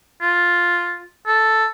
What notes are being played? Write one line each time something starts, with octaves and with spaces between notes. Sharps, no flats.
F4
A4